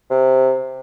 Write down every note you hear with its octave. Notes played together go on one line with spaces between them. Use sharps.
C3